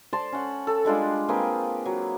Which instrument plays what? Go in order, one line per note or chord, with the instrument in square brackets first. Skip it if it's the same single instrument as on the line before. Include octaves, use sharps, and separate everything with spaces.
[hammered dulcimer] C5 D5 A5 C6
C#4 F#5
A4
G3 G#3 D4 F4
A#3 C4 G#4 B4
F#3